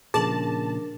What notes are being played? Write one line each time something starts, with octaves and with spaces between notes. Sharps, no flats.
A#2 C#3 F3 D4 G#4 A#4 A5